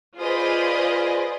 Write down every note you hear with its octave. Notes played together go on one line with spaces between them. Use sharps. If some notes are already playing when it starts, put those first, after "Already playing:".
F4 G#4 B4 C5 D5 D#5